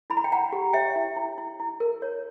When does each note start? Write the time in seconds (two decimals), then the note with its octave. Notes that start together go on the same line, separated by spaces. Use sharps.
0.10 E4 B5
0.17 A#5
0.24 G5
0.31 E4 F#5 A#5
0.52 G4
0.73 C#5 E5 G5
0.96 E4
1.16 E4
1.38 E4
1.60 E4
1.80 A#4
2.02 C#5